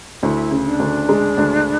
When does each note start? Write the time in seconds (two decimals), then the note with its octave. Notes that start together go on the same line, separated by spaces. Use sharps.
0.23 D2 E4
0.51 C#3
0.66 D4
0.80 D2
1.09 G#3
1.38 D2